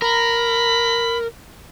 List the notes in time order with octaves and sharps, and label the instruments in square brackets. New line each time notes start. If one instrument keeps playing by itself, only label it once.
[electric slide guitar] A#4 [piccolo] B5